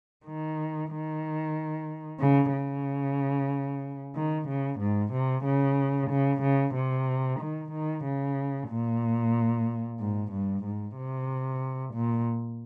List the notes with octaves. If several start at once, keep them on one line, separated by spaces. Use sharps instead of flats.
D#3
D#3
C#3
C#3
D#3
C#3
G#2
C3
C#3
C#3
C#3
C3
D#3
D#3
C#3
A#2
G#2
G2
G#2
C3
A#2